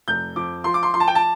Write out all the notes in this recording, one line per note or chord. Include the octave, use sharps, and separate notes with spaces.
F1 G6
F2 D6
F3 C6
D6
C6
F3 C6
A5
G5
A5